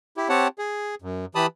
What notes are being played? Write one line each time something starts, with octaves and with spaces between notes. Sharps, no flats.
E4 G4
C4 G4 C#5 F#5 A5
G#4
F#2
E3 G4 A5 B5 D#6